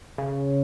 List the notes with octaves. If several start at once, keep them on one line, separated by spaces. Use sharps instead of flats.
C#3